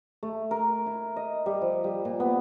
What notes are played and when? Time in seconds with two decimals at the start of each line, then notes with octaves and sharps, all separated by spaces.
0.23 A3
0.51 A#4
0.86 E4
1.16 D#5
1.46 G3
1.62 F3
1.84 G3
2.05 A#2
2.20 B3